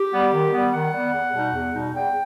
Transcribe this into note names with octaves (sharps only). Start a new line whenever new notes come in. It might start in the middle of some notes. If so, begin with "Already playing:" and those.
Already playing: G4
G3 B3
D#3
G3 B3
D#3 F#5
G3 B3
E2
B2 G3 D#4
E2
B2 G3 D#4
E2 G5